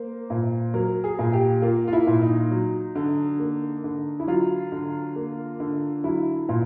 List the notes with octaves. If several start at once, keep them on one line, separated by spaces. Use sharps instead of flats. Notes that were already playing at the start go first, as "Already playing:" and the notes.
Already playing: A#3 C5
A#2
F#3 A#4
G#4
A#2
G4
A#3 F4
F4
E4
A#2
D#4
F#3
D3
A#3
D3
E4
F#3 F4
D3
A#3
D3
F#3 E4
A#2